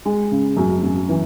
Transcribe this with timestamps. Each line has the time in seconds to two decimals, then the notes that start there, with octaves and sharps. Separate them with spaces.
0.05 G#3
0.31 C#3
0.57 F#2
0.83 F#2
1.09 E3